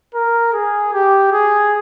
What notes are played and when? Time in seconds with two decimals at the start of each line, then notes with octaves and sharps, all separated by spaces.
0.15 A#4
0.53 G#4
0.93 G4
1.32 G#4